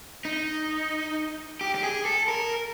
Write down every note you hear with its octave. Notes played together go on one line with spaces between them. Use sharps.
D#4
G4
G4
G#4
A4
A#4